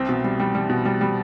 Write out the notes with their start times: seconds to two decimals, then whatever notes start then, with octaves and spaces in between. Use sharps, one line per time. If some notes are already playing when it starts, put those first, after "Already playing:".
Already playing: C2 C4
0.09 B2
0.24 G3
0.40 G3
0.55 G3
0.70 B2
0.85 G3
1.01 G3